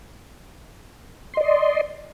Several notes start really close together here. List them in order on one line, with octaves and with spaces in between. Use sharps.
C6 D#5 D5